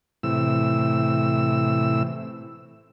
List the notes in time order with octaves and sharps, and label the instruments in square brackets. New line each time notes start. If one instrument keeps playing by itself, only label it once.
[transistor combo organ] A2 C3 E3 E6